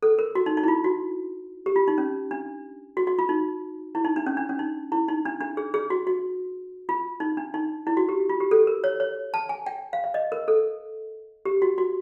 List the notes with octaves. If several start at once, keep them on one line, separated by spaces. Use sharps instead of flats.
A4
A#4
F#4
D#4
D#4
E4
F4
F#4
G4
F4
D#4
C#4
D4
F#4
F#4
F4
D#4
E4
D#4
D4
C#4
D4
C#4
D#4
E4
D#4
D4
D4
G#4
G#4
F#4
F#4
F4
D#4
D4
D#4
E4
F#4
G4
F4
G4
A4
A#4
C#5
C#5
A5
G#5
G5
F5
E5
D#5
A#4
A4
G4
F#4
F#4